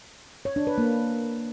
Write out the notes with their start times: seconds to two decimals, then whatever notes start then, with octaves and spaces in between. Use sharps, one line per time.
0.45 C#5
0.56 D4
0.67 B4
0.78 A#3